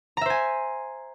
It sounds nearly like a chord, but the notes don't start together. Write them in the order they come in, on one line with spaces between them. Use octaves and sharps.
A#5 E5 C5 G#5